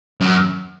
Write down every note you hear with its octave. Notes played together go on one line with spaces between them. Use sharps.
F#2